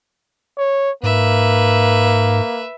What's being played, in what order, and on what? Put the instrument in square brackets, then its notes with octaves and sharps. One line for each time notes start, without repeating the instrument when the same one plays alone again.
[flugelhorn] C#5
[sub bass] G#2 [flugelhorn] A#3 [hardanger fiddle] B4 E5